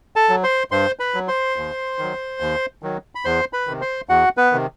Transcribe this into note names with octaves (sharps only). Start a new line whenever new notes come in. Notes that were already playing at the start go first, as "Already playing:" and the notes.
A4 A5
F#3
C5 C6
G2 C5 C6
B4 B5
F#3
C5 C6
D#2
D#3 F#3
D#2
D#3 F#3
B5
E2 C5 C6
B4 B5
C3 D#3
C5 C6
E2 F#4 F#5
B3 B4
C3 D#3